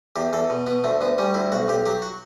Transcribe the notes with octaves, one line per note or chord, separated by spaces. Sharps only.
E2 G4
E2 A4
B2
B2 B3
D2 A3
D2 B3
G3 C#4
D2 E4
B1 F#4
B1 G4
F#3 G4
F#4